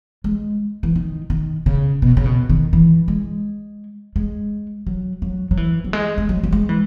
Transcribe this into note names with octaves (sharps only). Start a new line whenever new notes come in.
G#3
E3
D#3
D#3
C#3
B2
C#3
B2
D#3
E3
G#3
G#3
F#3
F#3
F#3
E3
F#3
G#3
G#3
F#3
F#3
G#3
E3